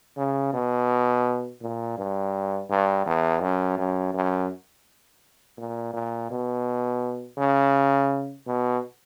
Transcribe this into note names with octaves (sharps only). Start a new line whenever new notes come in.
C#3
B2
A#2
G2
G2
E2
F#2
F#2
F#2
A#2
A#2
B2
C#3
B2